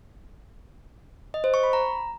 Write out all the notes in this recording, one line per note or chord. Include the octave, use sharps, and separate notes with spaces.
D#5
C5
C#6
B5
A#5